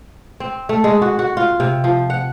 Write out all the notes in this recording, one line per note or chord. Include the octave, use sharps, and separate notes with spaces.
C4
A3
G#3
F#4
F#4
F4
C3
F3
F#5